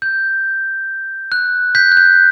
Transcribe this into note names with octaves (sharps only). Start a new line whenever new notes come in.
G6
F#6
G6 B6
F#6
G6